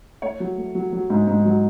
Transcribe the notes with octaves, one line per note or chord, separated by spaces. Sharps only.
A3 C#5
F#3
A3
F#3
F#3
G#2
G#2
F#3